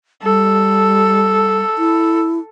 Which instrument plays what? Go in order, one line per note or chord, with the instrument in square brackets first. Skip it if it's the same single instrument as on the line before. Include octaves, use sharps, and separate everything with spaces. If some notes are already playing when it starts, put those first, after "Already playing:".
[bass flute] G3 [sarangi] A4
[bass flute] E4